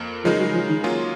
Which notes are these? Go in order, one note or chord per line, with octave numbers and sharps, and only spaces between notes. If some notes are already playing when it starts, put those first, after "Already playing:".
Already playing: F2 A#3
C#3 F3 G#3 D#4 A#4
F#3
F3
D#3
F#3 A#3 C#4 F4 G#4